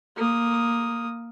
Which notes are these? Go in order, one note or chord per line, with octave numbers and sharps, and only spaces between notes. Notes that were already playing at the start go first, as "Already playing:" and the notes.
A#3 D#6